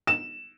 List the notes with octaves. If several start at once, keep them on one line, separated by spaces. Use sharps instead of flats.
E7